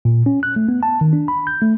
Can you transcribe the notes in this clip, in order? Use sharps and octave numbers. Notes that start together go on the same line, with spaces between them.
A#2
C#4
F#6
A3
B3
A5
D#3
D4
B5
G6
A3